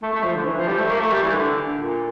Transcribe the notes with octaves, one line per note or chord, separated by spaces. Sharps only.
A3
A3
F3
D3
E3
F3
G3
A3
A#3
A3
G3
E3
D3
A#2